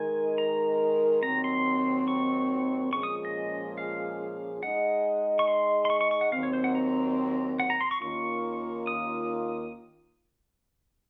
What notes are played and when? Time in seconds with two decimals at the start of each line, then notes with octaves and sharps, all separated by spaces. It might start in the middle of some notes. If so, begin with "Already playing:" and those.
Already playing: D#3 G#3 D#4 A#4 G#5
0.38 A#5
1.23 D#2 D#3 F#3 C4 A#5
1.44 C6
2.08 C#6
2.93 A#2 F3 G#3 C#4 G#4 C#6
3.03 D#6
3.25 D#5
3.78 F5
4.62 G#3 D#4 G#4 D#5 F#5
5.39 C#6
5.48 C6
5.85 C6
5.90 C#6
6.01 C#6
6.11 C#6
6.21 F#5
6.32 D#2 D#3 F#3 C4 F5
6.43 C#5
6.53 C5
6.64 F#5
6.75 A#5
7.60 F#5
7.70 A#5
7.81 C6
7.91 C#6
8.02 D#2 D#3 A#3 C#4 F4 C#6
8.87 D#6